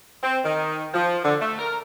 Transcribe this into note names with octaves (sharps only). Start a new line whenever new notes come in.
C4
D#3
F3
D3
A3
A#4